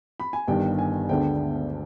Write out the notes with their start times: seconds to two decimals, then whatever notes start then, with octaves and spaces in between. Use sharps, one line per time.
0.20 B5
0.33 G#5
0.48 G1 G2 D#3 G5
0.78 G#5
1.09 D2 D3 G#3 B3 D4 G5